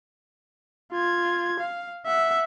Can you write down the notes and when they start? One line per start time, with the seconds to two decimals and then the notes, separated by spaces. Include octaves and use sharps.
0.92 F4 G#6
1.60 F5
2.06 E5 F#5